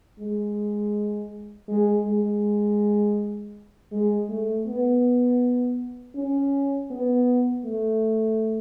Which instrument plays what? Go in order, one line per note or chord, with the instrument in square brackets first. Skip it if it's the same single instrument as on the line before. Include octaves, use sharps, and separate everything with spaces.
[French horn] G#3
G#3
G#3
G#3
A3
B3
C#4
B3
A3